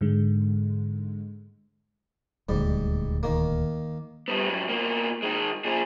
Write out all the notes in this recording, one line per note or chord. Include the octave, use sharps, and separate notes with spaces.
G#2 D3 G#3
D#1 D2 G#2 G3
D#3 A#3
G3 B3
G#2 F#3
B2 A#3
D#3 G#3
A#2 G#4